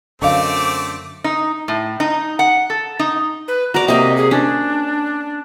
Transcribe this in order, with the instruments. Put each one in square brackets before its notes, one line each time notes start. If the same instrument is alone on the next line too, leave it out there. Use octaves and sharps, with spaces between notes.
[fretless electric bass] F#2 D3 [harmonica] A3 C4 [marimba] D#5 F5 [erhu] D6
[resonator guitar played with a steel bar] D#4
A2
D#4
F#5
A4
D#4
[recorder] B4
[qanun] F#4 D5 [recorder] A#5
[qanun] C3 A#3 [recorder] D#5
[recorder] G#4
[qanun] C#4 [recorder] D4